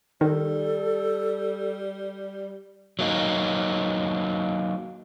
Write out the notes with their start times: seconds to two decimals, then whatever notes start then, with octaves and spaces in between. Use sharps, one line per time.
0.21 D#3 G3 A4
2.99 F#3 A#3 D#4